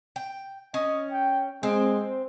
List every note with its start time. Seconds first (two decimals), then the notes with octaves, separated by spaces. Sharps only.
0.16 G5
0.74 C#4 D#5
1.12 G5
1.63 G#3 C4